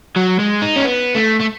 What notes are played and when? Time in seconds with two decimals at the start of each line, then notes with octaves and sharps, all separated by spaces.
0.16 F#3
0.39 G#3
0.62 D#4
0.76 C#4
0.85 B3
1.16 A3
1.41 A3